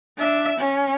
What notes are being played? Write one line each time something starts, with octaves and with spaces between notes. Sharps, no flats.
D4 E5
C#4